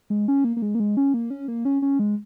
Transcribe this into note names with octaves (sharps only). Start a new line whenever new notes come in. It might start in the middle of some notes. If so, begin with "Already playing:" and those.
G#3
C#4
A#3
A#3
G#3
A#3
G#3
C#4
A#3
C#4
A#3
C#4
C#4
G#3